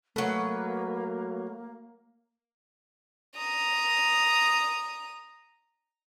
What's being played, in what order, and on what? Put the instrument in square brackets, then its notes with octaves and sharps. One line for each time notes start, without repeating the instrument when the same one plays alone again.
[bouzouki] F#3 B4 [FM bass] A3 [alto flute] A#3
[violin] A#5 D#6